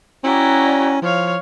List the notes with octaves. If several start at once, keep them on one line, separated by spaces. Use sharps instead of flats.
C#4 E4 F#4 D5 G5 A#5
F3 C#5 F5